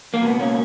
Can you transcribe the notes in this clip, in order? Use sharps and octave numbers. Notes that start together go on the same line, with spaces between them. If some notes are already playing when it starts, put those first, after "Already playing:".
A#3
C#2 B2 B3
A#3 C#4